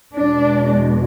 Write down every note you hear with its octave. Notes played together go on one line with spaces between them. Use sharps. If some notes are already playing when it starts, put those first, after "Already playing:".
E2 B2 G#3 D4